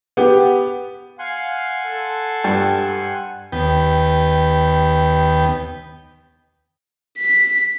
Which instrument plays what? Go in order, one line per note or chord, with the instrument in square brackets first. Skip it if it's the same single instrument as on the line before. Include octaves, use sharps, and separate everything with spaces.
[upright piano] B3 G4
[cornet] F5 [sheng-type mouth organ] F#5 G#5 C6
[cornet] A4
[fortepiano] G2
[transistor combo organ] D#2 B3 G5
[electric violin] B6